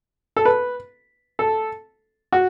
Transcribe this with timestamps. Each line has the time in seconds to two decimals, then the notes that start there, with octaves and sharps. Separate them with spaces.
0.36 A4
0.45 B4
1.39 A4
2.32 F#4